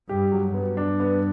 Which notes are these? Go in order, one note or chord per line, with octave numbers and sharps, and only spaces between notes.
G2 G4
F#3
G2 B3
D4
B3